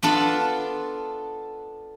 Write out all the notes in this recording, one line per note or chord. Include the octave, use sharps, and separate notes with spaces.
B3 D4 F4 A4